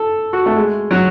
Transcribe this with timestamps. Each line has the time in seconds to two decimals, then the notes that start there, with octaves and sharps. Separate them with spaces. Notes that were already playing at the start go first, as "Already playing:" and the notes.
Already playing: A4
0.33 F#4
0.46 A3
0.56 G#3
0.91 F#3